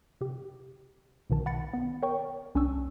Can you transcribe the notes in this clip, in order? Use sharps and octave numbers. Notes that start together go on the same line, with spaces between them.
C3 G4
B1 B2 D#3 A5
F#5 B5 A6 C#7
B3
A#4 C#5 G5 C#6
C2 C#4 D4 G#5 C#6 E6